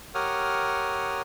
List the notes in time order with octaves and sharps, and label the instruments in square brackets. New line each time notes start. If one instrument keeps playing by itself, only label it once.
[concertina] G4 A#4 C#5 F#5 D#6 F6